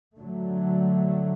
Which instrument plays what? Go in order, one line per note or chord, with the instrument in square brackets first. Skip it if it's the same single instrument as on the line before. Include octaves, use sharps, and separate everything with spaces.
[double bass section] D3 F#3 A3